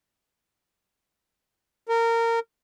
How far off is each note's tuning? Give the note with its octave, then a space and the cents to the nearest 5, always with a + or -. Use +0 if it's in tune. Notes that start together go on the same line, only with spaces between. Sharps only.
A#4 -20